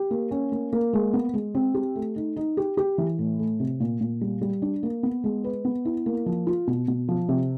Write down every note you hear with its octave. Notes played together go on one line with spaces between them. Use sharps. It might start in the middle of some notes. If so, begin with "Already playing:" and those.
Already playing: G4
A#3
C#4
A#3
A#3
G#3
B3
G#3
C4
G4
A3
D#4
D#4
G4
G4
E3
A2
A3
C3
A#2
A#2
G3
G3
D4
A#3
B3
G#3
B4
B3
E4
A#3
F3
F4
B2
B2
F3
C3